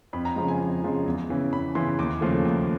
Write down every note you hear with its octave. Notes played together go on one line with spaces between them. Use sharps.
F2 B5
A#5
C#3 F3 G#3
G#5
F2
C#3 F3 G#3
E2
C#3 E3
E2 B5
C#3 E3 C6
D#2 D6
C#3 F3 A3
D#2